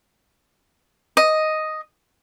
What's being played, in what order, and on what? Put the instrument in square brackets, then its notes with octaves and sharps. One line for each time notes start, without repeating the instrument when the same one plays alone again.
[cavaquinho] D#5